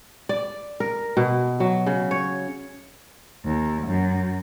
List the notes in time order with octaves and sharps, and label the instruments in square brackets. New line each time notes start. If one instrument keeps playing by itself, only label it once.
[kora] D5
A#4
B2
F#3
C#3
C#5
[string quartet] D#2
F#2